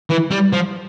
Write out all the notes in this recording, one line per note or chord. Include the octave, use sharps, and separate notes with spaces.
E3
G3
F3